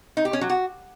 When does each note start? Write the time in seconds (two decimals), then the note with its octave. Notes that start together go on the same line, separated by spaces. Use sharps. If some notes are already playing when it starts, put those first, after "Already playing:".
0.17 D#4
0.25 G4
0.33 C#4
0.41 F#3
0.50 F#4